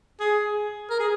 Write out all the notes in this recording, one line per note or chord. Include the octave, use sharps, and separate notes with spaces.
G#4
A#4
G#4